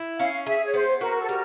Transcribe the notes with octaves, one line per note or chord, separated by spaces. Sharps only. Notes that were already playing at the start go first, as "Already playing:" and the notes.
Already playing: E4
C#4 F5
G#4 E5
C#5
B3 C5
F#4 A#4
A4
G3 A#4